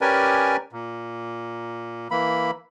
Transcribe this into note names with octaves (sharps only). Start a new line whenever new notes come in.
C#4 G4 A#4 B4 D5 G#5
A#2
E3 A#3 B5